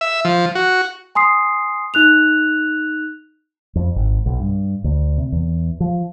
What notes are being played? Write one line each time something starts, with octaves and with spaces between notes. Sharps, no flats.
E5
F3
F#4
G#5 C6 D#6 C7
D#4 F#6 F7
F2
G#1
B1
G2
D2
C3
E2
F3